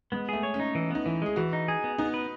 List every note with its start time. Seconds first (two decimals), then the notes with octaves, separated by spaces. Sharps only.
0.12 G#3 B3
0.29 A3 G#4
0.43 C#5
0.54 C#4
0.60 D#4
0.75 E3
0.91 B3 D#4
1.06 E3 E4
1.22 G#3 G#4
1.36 E3 F#4
1.53 D#4
1.68 G#4
1.84 B3
1.98 B3 D#4
2.14 B4